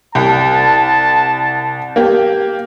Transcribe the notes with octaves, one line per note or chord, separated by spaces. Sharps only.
C2 A5
A#3 G4